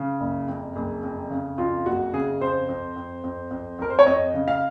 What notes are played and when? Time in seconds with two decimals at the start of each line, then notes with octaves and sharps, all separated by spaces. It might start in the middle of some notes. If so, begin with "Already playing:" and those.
Already playing: C#3
0.20 F#1
0.48 F2
0.76 F#1
1.03 F2
1.30 C#3
1.58 F2 F4
1.86 F#1 F#4
2.13 C#3 G#4
2.41 F2 C5
2.69 F2
2.96 F2
3.24 F2
3.51 F2
3.79 F2 A#4
3.90 C5
3.99 C#5
4.06 F2 D#5
4.34 C#3
4.48 F5